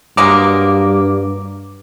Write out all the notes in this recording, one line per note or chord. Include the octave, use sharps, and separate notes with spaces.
G2 F#3 G#3 A#3 D6